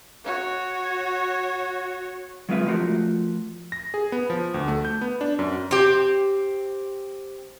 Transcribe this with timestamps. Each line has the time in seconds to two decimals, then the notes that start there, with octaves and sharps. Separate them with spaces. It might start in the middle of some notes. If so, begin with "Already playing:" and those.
0.25 F#4 C#5
2.49 F#3 G#3 C4 F4 B4 E5
2.66 F3 A3 F4 F#4 A#4
3.72 A#6
3.94 G#4
4.12 B3
4.30 F3
4.54 D2
4.68 A3
4.85 G6
5.01 B3
5.21 D4
5.39 F#2
5.71 C4 G4